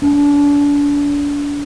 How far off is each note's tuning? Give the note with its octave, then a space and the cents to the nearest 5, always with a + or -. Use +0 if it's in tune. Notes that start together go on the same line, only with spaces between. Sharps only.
D4 -35